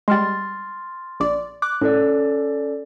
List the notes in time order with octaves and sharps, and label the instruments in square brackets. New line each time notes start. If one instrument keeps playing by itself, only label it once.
[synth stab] G3 G#3 [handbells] C6 F6 A6
[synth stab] A#1 D5
[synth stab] D6 [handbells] F#6
[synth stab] A2 [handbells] C#4 A4 D5